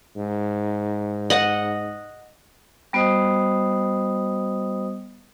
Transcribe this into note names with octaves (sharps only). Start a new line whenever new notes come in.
G#2
D#5 F#5
G3 B3 F#4 C5 D#5 D#6